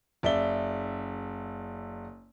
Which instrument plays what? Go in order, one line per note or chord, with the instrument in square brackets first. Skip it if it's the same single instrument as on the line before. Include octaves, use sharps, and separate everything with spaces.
[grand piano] F#1 D5 E5 G7